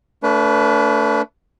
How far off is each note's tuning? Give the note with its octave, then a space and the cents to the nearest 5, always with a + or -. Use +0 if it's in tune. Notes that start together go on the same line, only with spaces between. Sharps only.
A3 +20 D4 -35 B4 +0